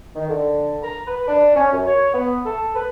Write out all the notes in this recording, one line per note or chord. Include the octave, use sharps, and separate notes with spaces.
D#3
D3
A#5
B4
D4
C#4
F#2
C#5
B3
A4
B4